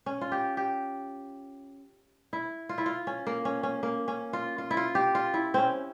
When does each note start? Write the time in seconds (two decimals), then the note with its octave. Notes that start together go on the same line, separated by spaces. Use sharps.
0.06 C#4
0.21 F4
0.32 G4
0.57 G4
2.33 E4
2.69 F4
2.78 E4
2.86 F4
3.07 C#4
3.27 A#3
3.45 C#4
3.63 C#4
3.83 A#3
4.08 C#4
4.33 F4
4.58 F4
4.71 E4
4.77 F4
4.95 G4
5.15 F4
5.34 E4
5.54 C4 C#4